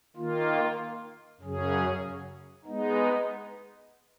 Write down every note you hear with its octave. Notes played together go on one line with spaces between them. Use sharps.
D#3 A#3 F4
F#2 C#3 F#3 C#4 G#4
G#3 B3 D#4